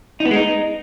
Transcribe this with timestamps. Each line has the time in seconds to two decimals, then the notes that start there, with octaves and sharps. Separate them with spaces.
0.20 D#4
0.25 B3
0.31 G#3
0.36 D#4